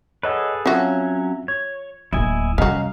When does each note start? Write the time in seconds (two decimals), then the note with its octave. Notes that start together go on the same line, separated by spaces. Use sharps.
0.23 G#4 A4 B4 C#5 D#5 F#5
0.66 F3 F#3 C4 C#4 F#4 E5
1.48 C#5 G#6
2.13 D1 A#3 E4 D#5 G#5
2.58 F2 C3 G3 C#4 F#4 D#5 F5 A#5